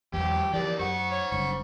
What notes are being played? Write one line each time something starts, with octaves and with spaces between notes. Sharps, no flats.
E2 E3 F#3 G4
E3 F3 G4 A#4 D5
F#2 C5 F#5 C#6
C#5
F#1 G2 C#3 C#6